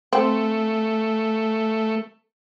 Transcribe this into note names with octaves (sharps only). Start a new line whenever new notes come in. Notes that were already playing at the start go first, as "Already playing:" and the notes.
A3 C4